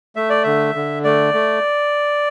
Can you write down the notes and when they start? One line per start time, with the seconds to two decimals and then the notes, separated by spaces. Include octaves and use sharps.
0.16 A3 E5
0.30 D5
0.43 D3 E5
0.75 D3
1.04 A3 D5
1.34 A3